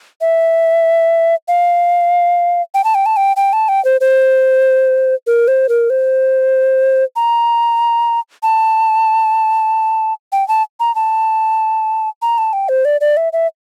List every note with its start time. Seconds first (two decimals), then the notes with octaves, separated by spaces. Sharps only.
0.21 E5
1.48 F5
2.74 G5
2.84 A5
2.95 G5
3.06 A5
3.17 G5
3.37 G5
3.53 A5
3.69 G5
3.85 C5
4.01 C5
5.27 A#4
5.48 C5
5.69 A#4
5.90 C5
7.16 A#5
8.43 A5
10.32 G5
10.48 A5
10.80 A#5
10.95 A5
12.22 A#5
12.38 A5
12.53 G5
12.69 C5
12.85 D5
13.01 D5
13.17 E5
13.33 E5